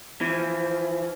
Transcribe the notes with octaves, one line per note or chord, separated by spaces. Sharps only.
E3 F3